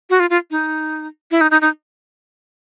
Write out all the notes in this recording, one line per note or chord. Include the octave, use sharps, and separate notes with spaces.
F#4
F4
F4
D#4
E4
D#4
D#4
D#4